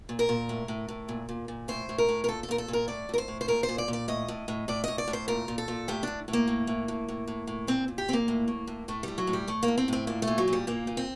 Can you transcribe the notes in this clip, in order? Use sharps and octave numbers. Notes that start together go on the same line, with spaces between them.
A#2
A#4
A#2
A2
A2
A2
A#2
A#2
A#2
A2 C5
A2
A#4
A2
A#4
A#2 A4
A4
A#2 A#4
A4
A#2
A#4
A2 D5
A2 A#4
C5
A2
C5
A#2 A#4
C5
A#2
D5
A#2
D5
A2 D#5
A2
A2
A2 D5
A2 D#5
D5
A2
C5
A#2 A#4
A#2
A4
A#2
A2 G4
A2 D4
A2
A#3
A2
A2
A2
A2
A2
A2
A#2 C4
A#2
G4
A#2 C4
A#3
A2
A2
A2
A2 A3
A2 G3
F#3
A2
G3
A2 A3
A#3
A2
C4
A2 C4
A#2 A#3
A3
A#2
F#3
A#2
G3
A#2 A#3
A#2
C4